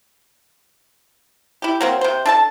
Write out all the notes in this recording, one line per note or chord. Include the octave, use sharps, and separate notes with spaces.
E4 G4
F#3 A#3 C4
C3 C5
D4 A4 A5